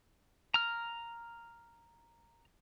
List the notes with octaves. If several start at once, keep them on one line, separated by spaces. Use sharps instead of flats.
A#5 F6